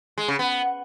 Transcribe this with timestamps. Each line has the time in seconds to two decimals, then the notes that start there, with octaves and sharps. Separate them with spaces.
0.18 G#3
0.28 C#3
0.39 B3